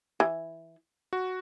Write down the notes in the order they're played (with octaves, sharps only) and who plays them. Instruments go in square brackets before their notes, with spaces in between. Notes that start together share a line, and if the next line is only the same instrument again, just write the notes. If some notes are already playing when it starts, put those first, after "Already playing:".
[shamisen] E3
[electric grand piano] F#4